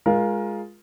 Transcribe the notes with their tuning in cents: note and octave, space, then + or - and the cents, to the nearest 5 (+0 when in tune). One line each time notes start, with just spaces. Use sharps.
G#3 +0 F4 +0 A#4 +20